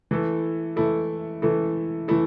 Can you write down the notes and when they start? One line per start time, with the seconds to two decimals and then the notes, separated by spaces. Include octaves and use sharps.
0.11 E3 A3 E4 A4
0.76 E3 A3 E4 A4
1.42 E3 A3 E4 A4
2.08 E3 A3 E4 A4